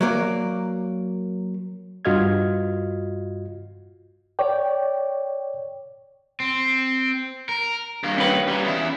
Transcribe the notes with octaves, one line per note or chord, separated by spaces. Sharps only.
F#3 A#3 D5
G2 F4 F#4 D#5 F6 G#6
C#5 D5 G5
C4
A#4
G2 A#3
C#4 B4
G3 A#3
E2 E4